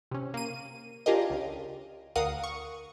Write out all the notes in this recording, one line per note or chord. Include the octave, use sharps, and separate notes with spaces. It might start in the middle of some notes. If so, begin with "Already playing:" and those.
C3 C#4
A#3 D#7
D4 F4 G4 G#4 A#4 D#5
C#2 C#3
D2 A#4 F5 F#5 D#6
C#6